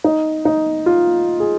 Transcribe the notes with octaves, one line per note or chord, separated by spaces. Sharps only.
D#4
D#4
F4
G#4